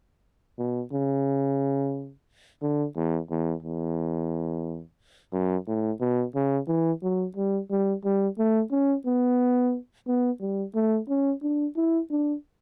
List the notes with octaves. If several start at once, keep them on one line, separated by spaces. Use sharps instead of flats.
B2
C#3
D3
E2
E2
E2
F#2
A2
B2
C#3
E3
F#3
G3
G3
G3
A3
C#4
B3
B3
G3
A3
C#4
D4
E4
D4